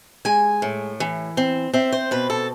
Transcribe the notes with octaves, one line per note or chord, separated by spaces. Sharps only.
G#3 G#5
A2
E3
C4
C4 E5
C5
B2 B4
A4